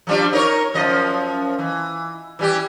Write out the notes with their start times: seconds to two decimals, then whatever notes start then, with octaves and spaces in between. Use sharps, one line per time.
0.07 F3 G3 D4
0.33 D#4 A#4 C#5
0.74 F#2 F3 D#5
1.59 E3
2.39 E3 G3 G4